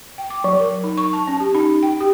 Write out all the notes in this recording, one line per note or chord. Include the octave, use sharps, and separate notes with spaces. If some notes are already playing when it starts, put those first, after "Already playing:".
G5
D6
F#3
A#4
D#4
C#6
A5
C#4
G4
D#4
G5
G4